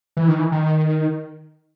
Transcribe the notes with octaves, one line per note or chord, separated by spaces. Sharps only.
E3
D#3
E3
D#3